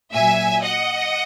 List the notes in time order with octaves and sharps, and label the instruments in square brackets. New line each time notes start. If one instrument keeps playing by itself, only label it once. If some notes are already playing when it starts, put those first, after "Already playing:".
[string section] A#2 F#3 E5 G#5
D#5 F#5